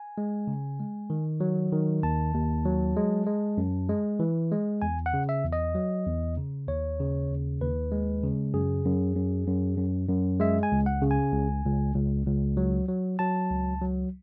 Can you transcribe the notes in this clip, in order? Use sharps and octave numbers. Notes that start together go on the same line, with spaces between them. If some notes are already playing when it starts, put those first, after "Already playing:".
Already playing: G#5
G#3
C#3
G#3
D#3
F#3
D#3
D#2 A5
D#2
F#3
G#3
G#3
F#2
G#3
E3
G#3
E2 G#5
F#5
C#3
E5
E2
D#5
F#3
E2
C#3
D#2 C#5
C#3
D#2
D#2 B4
G#3
C#3
F#2 G#4
F#2
F#2
F#2
F#2
F#2
G#3 E5
G#5
C#2
F#5
C#3
G#5
C#2
C#2
C#2
C#2
F#3
F#3
F#3 A5
C#2
F#3